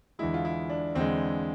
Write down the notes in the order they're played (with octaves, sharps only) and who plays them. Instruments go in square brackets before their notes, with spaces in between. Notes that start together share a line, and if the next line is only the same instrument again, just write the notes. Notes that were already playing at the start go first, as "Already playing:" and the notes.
[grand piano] E2 D3 G#3 [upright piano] E4
[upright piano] F4
E4
D4
[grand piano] E2 D3 G#3 [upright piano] C4